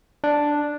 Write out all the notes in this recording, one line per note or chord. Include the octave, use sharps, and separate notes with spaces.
D4